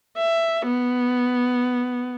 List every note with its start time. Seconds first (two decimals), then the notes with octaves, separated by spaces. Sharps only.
0.17 E5
0.66 B3